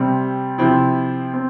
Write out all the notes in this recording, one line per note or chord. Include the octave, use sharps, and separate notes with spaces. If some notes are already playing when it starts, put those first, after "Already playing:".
Already playing: C3 G3 C4
C3 F3 C4 E4
C4